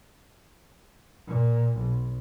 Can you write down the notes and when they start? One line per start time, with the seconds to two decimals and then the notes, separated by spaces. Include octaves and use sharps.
1.27 A#2
1.77 B1